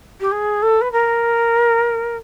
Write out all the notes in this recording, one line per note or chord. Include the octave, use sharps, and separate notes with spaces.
G4
G#4
A4
B4
A#4